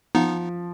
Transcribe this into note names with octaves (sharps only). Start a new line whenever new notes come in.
F3 B3 D#4